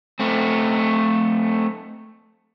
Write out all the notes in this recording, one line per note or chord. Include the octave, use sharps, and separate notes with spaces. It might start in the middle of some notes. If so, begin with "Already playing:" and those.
A3 C4